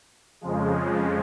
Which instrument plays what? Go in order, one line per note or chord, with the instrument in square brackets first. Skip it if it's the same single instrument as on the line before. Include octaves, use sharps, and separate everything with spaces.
[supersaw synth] F2 C#3 F3 G#3